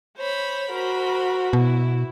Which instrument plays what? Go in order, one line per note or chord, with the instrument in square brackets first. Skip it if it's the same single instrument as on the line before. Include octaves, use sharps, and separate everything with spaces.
[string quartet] C5 C#5 B5
[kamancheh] F#4 [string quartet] A#4 C5 B5
[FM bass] B2 [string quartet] E4